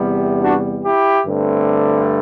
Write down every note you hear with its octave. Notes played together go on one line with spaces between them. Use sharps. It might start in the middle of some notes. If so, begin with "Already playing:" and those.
Already playing: E2 C3 G3 B3
D4 F#4
E4 G4
G2 D3 A3 C4